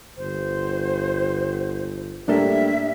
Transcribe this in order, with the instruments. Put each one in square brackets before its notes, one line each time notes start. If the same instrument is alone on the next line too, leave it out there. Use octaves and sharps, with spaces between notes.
[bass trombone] G1 [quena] C5
[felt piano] A2 A#3 A4 [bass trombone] G3 [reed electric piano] D4 [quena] E5